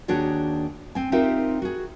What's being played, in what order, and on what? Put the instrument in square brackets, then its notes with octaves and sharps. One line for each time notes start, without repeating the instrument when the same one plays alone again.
[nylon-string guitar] D#2 D4 F#4 G#4 C#5 D5
C4 G#5
C4 D#4 F4 G4 A#4 E5
F#4 G#4